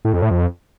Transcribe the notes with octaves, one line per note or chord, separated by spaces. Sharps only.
A2
F2
A2
F2